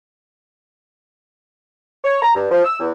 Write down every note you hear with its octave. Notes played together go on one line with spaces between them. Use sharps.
C#5
A#5
G2
F3
E6
E2